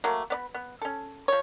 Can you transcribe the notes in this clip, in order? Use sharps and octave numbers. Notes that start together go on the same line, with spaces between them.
F#3 A3 A#3
B3 D5 B5
B3
C#4 A4
F3 C#5